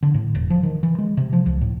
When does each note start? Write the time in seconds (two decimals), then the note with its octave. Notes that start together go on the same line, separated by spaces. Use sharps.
0.03 D3
0.14 A2
0.35 E1
0.50 F3
0.63 D#3
0.83 E3
0.98 G#3
1.17 C3
1.33 F3
1.46 C#2
1.61 A2